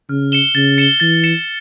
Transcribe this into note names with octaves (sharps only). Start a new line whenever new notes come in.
C#3 F6
C#7 E7 G7
C#3 A6
C#7 E7 G7
E3 A6
C#7 E7 G7